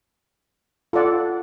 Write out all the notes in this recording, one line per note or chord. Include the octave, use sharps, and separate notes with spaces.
F4 A4 D5 F#5